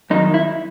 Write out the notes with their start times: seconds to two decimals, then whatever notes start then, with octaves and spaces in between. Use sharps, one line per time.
0.10 F#2 D#3 F#3 D#4
0.34 E4